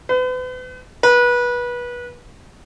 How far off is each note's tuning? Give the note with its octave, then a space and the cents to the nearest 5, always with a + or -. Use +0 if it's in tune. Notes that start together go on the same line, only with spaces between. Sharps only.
B4 +40
B4 -25